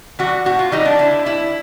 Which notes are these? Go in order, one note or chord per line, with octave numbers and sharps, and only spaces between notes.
E3 G3 F#4
A2 F#4
F4
E3 G3 D#4
D4
D3 E4
G3 E4